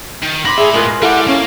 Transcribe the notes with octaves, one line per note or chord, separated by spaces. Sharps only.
D#3
A2 B5 C6 D6 A#6
G#4 E5
G#3 F4 A#4 B4
G3 E4 G4 A4 F#5
A#3 C#4